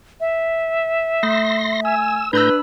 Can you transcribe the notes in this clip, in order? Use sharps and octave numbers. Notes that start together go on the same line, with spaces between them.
E5
A3 C6 A#6
G#5 E6
A2 D4 B4 A#5 B5 E6 G6